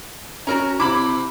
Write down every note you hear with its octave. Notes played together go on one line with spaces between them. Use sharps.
C#4 F#4 A#4 A#5
C3 E4 B5 D6